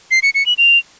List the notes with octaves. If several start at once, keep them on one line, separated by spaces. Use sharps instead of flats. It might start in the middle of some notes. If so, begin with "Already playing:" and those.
C7
C#7
C#7
F#7
F7